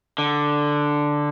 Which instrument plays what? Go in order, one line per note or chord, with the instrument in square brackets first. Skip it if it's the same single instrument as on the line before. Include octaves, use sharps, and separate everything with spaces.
[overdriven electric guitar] D3